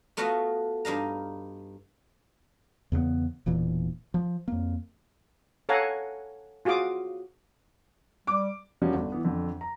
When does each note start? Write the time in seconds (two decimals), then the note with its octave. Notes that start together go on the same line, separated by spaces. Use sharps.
0.17 A3 B3 F4 F#4 D#5
0.85 G2 D#4 F5 A#5
2.92 E2 C#3 A3 B3
3.46 E1 A#2 E3
4.14 F3
4.48 F2 A#3
5.69 A4 C#5 F5 F#5 G#5 A#5
6.65 F4 F#4 G#4 F5 D6 D#6
8.27 G3 D6
8.82 F3 G3 A#3 C#4 D#4 F#4
8.94 G1
9.12 E3 B3
9.24 F2 D3
9.61 A#5